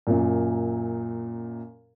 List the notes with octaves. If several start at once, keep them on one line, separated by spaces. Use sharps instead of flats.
F#2 A#2